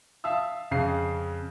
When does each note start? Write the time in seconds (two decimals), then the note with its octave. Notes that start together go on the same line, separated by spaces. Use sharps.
0.24 E5 F5 A5 D#6 E6
0.71 F2 C#3 F5 C7